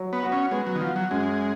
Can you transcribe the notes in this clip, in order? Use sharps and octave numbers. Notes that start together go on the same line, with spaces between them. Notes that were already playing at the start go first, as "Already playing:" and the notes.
Already playing: F#3
B3
F#4
C#4
G#3 B3
F#3
D#3
F3 F#4
F#3
F#2 G#3